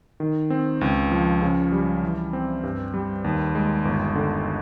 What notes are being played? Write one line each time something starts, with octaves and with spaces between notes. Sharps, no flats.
D#3
C4
C#2
F3
C#3
G3
E3
C4
G2
G3
D#2
G#3
G1
D3